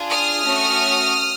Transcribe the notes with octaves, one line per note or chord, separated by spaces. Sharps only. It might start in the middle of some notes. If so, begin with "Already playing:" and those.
Already playing: D4 F4 G#4
D#6 F6
A3 C#4 F#4